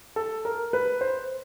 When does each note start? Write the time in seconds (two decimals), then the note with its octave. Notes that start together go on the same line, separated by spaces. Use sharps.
0.16 A4
0.45 A#4
0.73 B4
1.01 C5